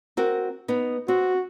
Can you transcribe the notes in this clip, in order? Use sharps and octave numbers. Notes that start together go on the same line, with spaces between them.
C4 F#4 A#4
B3 D#4
C4 F#4